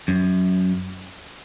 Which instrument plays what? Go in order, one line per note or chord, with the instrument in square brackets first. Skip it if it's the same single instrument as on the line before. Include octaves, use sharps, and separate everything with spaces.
[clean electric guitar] F#2